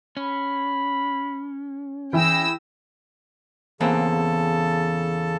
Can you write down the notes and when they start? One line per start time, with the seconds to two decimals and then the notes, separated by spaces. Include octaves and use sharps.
0.17 C#4 B5
2.13 E3 E4 G#4 G5 E6 A#6
3.81 E2 C#3 A#3 C4 A4 A5